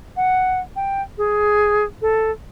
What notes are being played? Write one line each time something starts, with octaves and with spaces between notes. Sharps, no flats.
F#5
G5
G#4
A4